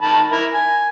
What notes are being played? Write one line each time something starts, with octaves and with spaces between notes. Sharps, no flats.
D#3 A5 B5
E4 A#4
G#5